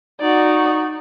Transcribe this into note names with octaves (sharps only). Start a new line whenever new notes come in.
D#4 F#4 D5